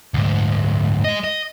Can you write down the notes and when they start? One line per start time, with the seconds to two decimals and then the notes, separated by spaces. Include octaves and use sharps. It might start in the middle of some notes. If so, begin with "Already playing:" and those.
0.14 D2 G#2
1.05 G#3 D#5
1.24 D#5